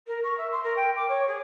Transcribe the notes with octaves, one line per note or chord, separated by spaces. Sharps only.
A#4
C#6
E5
C6
A#4
G5
D6
C#5
G#4